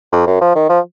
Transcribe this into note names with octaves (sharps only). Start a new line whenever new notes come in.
F2
F#2
F3
D#3
F3